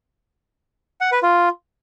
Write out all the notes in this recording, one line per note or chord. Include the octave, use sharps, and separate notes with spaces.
F#5
B4
F4